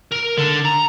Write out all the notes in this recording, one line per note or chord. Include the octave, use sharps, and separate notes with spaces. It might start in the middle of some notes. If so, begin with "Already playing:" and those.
A#4
D3
A#5